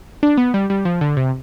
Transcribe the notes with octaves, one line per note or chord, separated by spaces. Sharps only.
D4
B3
G3
G3
F3
D3
C3